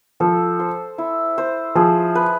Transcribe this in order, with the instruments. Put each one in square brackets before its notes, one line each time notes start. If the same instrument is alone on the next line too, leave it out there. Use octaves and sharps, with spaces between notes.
[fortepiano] F3 [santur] A4
[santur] C5
E4
C5
[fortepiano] F3 [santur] G#4
[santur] B4